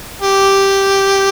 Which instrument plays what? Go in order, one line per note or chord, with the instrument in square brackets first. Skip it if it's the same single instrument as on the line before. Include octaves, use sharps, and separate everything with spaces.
[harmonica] G4